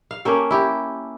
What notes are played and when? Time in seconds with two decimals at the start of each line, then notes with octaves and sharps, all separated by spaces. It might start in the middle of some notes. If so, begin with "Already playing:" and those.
0.11 F5
0.25 A#3 C#4 G4 A4
0.51 E4 G4